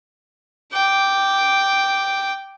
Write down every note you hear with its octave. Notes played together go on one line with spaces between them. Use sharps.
G5 D6